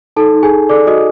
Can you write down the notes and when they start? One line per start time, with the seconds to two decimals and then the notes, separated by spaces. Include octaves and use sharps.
0.16 D#4 A4 A5
0.34 D#4
0.43 G#4 G#5
0.51 A4
0.69 A4 D5 D6
0.87 F#4 D#5 D#6